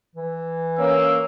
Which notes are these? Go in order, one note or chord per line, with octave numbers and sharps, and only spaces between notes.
E3
A#3 C#4 E6